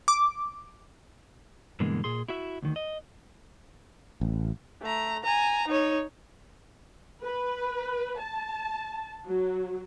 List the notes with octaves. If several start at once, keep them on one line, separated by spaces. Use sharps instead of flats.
D6
G2 B2 D3 E3 G#3 A#3
A#2 G#4 C6
E4 F#4 E5
D2 D#3
D#5
A1
A3 A#5
G#5 A#5
D#4 C#5
B4
A5
F#3